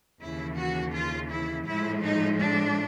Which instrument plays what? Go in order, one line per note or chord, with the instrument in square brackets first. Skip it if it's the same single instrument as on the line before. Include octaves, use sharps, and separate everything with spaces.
[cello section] D#2 C#3 E3 E4
F#4
F4
E4
A2 F3 G#3 E4
D#4
D4